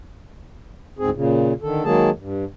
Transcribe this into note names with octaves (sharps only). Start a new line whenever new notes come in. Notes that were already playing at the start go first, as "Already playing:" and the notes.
D2 G#2 C4 G#4
A#2 C#3
D3 D#3 A4
D#3 F#3 G#3 A#3 G#4 A5
G2